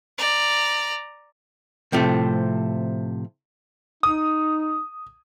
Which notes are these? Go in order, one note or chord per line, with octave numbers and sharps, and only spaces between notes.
D5 A#5
A2 C3 F3 A3
D#4 D#6